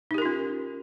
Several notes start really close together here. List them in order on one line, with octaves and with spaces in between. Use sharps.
D#4 G4 A#4 F4 C#4